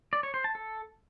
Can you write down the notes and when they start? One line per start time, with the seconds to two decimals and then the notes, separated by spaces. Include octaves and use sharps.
0.13 D5
0.23 C#5
0.34 C5
0.44 A5
0.55 A4